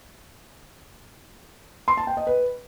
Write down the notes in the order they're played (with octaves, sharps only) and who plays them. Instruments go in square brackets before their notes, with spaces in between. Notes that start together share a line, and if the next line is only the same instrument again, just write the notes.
[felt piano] C6
A5
G5
D#5
B4